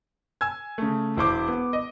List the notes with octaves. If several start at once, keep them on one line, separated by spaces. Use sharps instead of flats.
G#5 E6 G#6
C#3 A3
E1 E4 C5 D6
B3
D#5